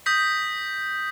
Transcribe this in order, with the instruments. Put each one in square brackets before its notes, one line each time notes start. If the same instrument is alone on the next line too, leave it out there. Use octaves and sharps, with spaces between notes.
[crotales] D#6 G6 A#6 B6